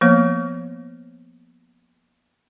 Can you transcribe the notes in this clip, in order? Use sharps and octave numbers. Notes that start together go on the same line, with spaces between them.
F3 A#3 B3 C#5